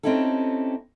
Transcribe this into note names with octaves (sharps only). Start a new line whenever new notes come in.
C4 C#4 D#4 E4 G4 A4